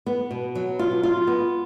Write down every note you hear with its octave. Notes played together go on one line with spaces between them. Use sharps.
B3
B2
F#3
F4
F4
B3